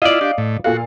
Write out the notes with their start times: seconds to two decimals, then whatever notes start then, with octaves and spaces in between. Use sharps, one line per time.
0.02 E4 F4 D5 D#5 F5
0.21 D4 G4
0.38 A2
0.64 A#2 F#4 A4 F5